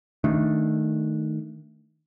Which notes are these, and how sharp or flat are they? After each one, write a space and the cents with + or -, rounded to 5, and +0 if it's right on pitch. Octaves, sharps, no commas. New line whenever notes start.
D#3 +0 A3 +0 D4 +0